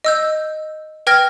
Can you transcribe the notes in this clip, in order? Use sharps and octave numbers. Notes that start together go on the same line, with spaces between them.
D#5 E6 G6
B4 G5 F6 G#6 A#6